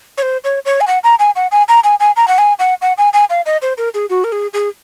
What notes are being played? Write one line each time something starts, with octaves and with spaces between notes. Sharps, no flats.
C#5
C5
C#5
C#5
G#5
F#5
A#5
G#5
F#5
G#5
A#5
G#5
G#5
A#5
F#5
G#5
F#5
F#5
G#5
G#5
F5
D#5
C5
A#4
G#4
F#4
A#4
G#4
G#4